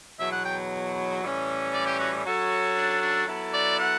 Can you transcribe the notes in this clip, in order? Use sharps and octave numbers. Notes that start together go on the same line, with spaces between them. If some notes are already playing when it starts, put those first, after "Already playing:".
E2 B2 F#3 E5
F#5
G5
A2 E3 G3 C#4
D5
G4
F#4
F#3 C#4 F#4 A4 C#5
D4
D4
F#3 B3 E4 A4
D5
F#5